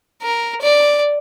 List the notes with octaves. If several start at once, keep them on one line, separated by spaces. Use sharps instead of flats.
A#4
D5